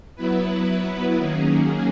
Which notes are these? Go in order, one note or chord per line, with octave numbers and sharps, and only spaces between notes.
F#3 B3 E4 B4
D#3 F#3 A#3 C#4 G#4